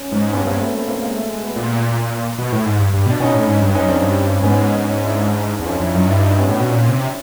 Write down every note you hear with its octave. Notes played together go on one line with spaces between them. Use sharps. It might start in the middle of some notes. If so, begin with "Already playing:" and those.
Already playing: C#4
G#2
G2 B3 C#4
G2 A#3 C4
A3 B3
A3 B3
A#3 C4
G#3 A#3
A3
G#3
A3 B3
A#2
B2
A2
G#2
G2
G2
B2 D4
B2 C#4 D#4
A2
G#2
G2
F#2 C#4 D#4
F2 C4 D4
G2
G#2 B3 C#4
C#4 D#4
D4 E4
D4 E4
E2
F2 C#4 D#4
F2 D4 E4
F#2 D#4 F4
G2 D4 E4
D#4 F4
D4 E4
B3 C#4
A2
B2
A#2
C3